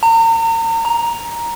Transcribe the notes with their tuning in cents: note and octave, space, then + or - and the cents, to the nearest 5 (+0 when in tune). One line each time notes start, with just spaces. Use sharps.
A#5 -40
A#5 +5